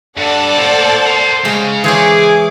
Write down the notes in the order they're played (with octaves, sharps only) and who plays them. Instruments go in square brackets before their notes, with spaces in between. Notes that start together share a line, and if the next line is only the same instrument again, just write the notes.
[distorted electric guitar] G2 [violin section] A4 D5 F#5
[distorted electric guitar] A2 A#3 [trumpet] C5
[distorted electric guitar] A#4 C6
[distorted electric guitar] C#3 [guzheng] G#3 F5
[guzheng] E3 C5 C#5 [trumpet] G#4 [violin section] D6